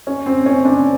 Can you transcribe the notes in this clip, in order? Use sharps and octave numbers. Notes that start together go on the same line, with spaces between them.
C#4
C4
C#4
C4 D4